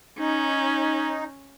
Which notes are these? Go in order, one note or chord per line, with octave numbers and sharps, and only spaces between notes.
C#4 D#4